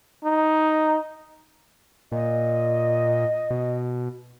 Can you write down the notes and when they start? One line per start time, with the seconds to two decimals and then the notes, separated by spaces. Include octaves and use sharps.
0.24 D#4
2.12 A#2 D#5
3.51 B2